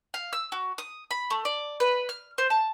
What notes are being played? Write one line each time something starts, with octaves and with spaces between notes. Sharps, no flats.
F5
E6
F#4
D#6
B5
A3
D5
B4
F6
C5
A5